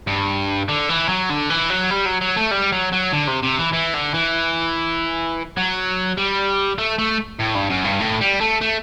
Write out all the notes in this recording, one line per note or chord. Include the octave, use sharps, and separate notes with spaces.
G2
D3
E3
F#3
D3
E3
F#3
G3
F#3
F#3
A3
G3
F#3
F#3
D3
C3
C3
E3
E3
D3
E3
F#3
G3
A3
A3
A2
G2
F#2
G2
A2
G3
A3
A3